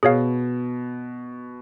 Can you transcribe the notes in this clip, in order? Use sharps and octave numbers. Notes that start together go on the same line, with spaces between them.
B2 G#4 C#5 F5